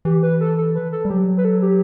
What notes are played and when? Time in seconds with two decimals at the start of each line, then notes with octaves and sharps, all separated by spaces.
0.05 E3 G4
0.23 B4
0.41 A4
0.58 A4
0.75 B4
0.92 A4
1.05 G3
1.09 F#3 G4
1.38 B4
1.45 A4
1.62 G4